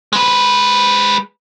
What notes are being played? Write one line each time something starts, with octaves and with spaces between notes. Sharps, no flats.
G#3 B4